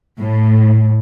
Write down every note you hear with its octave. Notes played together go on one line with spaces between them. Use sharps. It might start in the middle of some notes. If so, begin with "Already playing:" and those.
A2